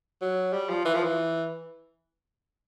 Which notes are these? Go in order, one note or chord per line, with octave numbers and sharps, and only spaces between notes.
F#3
G3
F3
E3
F3
E3